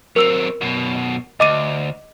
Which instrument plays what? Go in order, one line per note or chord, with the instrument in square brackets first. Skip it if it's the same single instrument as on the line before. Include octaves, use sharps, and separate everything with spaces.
[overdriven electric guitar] F#3 C4 [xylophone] A#4 E6 F7
[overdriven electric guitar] F#2 B2
[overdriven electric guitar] D2 [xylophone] D#5 D6 D#7